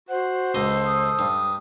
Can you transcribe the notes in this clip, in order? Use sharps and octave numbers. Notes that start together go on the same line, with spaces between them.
F#4 C5 F#5
C#2 A4 D#5
D#6
G2